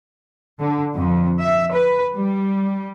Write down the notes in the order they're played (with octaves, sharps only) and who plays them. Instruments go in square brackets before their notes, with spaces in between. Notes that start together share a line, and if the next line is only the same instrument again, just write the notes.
[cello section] D3
F2
E5
B4
G3